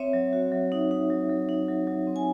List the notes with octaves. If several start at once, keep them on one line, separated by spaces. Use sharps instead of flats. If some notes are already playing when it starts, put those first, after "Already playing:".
Already playing: C4 C#5 E5
F#3
F#4
F#3
D#4
D#4
F#3
F#3
D#4
F#3
F#3
C4
G#5